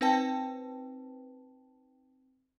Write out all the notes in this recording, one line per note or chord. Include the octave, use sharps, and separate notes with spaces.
C4 D#4 B4 C5 G5 A5